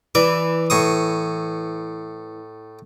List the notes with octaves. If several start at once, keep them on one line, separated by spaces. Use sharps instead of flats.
E3 D5
A2 C#6 D#6